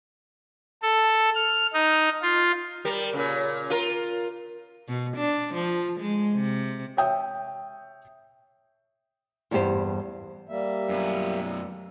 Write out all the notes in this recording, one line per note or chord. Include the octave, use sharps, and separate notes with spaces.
A4
F6
D#4
F4
G3 A#4
A#2 C#3
F4 A#4
B2
D4
F3
G#3
C3
C#5 E5 G5 D#6
E2 G2 B3 G4 C5
G3 A#3 E5
F#2 B3